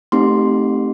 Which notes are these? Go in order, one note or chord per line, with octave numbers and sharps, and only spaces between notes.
A3 C4 D#4 G4 C6